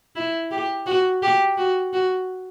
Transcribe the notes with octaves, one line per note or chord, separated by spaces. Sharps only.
E4
G4
F#4
G4
F#4
F#4